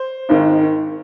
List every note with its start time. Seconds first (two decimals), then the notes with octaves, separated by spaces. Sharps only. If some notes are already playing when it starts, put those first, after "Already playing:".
Already playing: C5
0.29 G#1 G#2 D#3